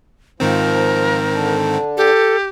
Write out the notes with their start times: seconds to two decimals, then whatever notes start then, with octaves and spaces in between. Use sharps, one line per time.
0.40 G#2 D#3 F3 C4 A#4
1.32 D3 D4
1.97 G4 A4